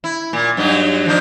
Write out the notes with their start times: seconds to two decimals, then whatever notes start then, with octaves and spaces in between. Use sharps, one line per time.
0.04 E4
0.33 A#2
0.57 G2 F#3 D#4
1.06 F3 D4 D#4